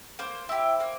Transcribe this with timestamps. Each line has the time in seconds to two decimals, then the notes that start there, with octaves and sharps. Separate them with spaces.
0.19 A#3 C5
0.49 E4 G4
0.80 A#3